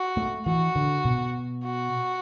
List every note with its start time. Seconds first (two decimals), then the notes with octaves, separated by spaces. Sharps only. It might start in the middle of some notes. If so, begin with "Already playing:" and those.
Already playing: F#4
0.17 A3
0.46 E3 F#4
0.76 D3
1.05 B2
1.65 F#4